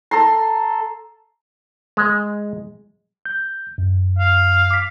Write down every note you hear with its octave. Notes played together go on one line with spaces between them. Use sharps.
A4 A#5 C6
G#3
G6
F#2
F5
D6 B6